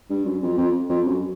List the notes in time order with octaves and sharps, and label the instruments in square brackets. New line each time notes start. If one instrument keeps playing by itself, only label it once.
[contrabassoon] G2
F#2
F2
F2
F2
F#2